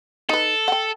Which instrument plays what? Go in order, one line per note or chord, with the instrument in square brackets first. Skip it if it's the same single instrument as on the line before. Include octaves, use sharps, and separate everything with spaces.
[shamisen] D#4 B4 [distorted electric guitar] A4
[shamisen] F#5 G5